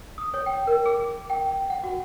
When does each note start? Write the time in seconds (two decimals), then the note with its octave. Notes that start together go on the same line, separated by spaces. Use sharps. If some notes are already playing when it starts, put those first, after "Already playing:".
0.18 D#6
0.34 C#5
0.46 G5
0.67 A#4
0.85 G#4
1.30 G5
1.70 F#5
1.84 F#4